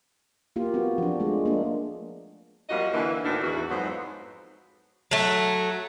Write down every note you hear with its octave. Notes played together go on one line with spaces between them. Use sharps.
A#3 F4 G4
B3 C4 F#4
F3 D4
G#3 A3
A#3 D4
F#2 F3 G3 A#3 F#4 D#5
D3 E3 A#3
D2 A2 D#3 B3 D4
E2 E3 F#4
F2 G#2 F#3 B3 C5
F#3 A3